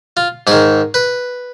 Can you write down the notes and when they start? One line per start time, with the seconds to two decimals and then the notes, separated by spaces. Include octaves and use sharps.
0.17 F4
0.47 G#2 D#3 G#4
0.94 B4